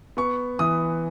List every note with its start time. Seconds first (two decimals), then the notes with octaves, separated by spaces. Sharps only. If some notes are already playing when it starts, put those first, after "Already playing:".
0.17 B3 C#6
0.59 E3 D#6